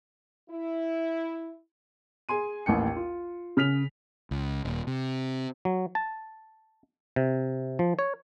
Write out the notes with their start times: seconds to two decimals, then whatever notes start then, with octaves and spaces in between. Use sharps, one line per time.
0.50 E4
2.29 G#4 G#5 C6 D#7
2.66 A1 D#2 G5 C#7
2.96 F4
3.57 C#3 F6 B6 F7
4.31 C#2
4.65 D#1
4.87 C3
5.65 F#3
5.95 A5
7.16 C3
7.79 F3
7.99 C#5